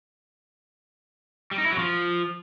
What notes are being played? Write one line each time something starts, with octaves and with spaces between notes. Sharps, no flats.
G3
D#4
E4
F#3
F3